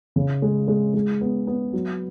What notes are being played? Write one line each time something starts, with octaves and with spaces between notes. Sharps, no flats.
C#3
G#3
G#3
G#3
B3
B3
F#3